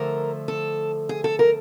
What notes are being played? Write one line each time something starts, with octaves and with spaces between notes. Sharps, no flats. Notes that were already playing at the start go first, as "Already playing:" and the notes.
Already playing: D3 F3 A3 A#4
A4
G#4
A4
A#4